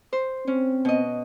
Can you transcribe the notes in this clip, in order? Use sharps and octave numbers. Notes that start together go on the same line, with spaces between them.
C5
C4 C#4
B2 D#5